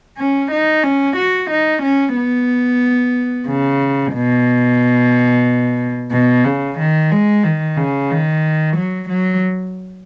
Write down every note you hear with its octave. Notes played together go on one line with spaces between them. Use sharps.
C#4
D#4
C#4
F#4
D#4
C#4
B3
C#3
B2
B2
C#3
D#3
G#3
D#3
C#3
D#3
F#3
F#3